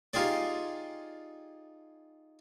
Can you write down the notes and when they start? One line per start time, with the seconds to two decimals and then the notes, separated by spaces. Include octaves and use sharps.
0.14 D#4 F4 G4 G#4 D5